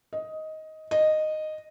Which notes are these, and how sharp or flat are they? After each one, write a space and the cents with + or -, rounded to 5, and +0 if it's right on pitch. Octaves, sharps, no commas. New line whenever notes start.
D#5 +10
D#5 -10